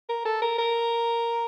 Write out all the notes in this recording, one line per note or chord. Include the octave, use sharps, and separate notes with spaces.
A#4
A4
A#4
A#4